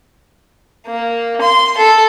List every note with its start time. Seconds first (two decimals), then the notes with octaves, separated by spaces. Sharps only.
0.87 A#3
1.41 C6
1.78 A4